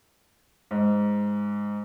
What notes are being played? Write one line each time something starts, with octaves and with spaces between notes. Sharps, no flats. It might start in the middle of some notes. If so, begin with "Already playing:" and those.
G#2